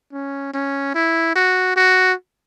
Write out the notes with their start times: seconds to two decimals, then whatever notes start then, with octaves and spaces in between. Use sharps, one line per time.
0.12 C#4
0.53 C#4
0.95 E4
1.35 F#4
1.76 F#4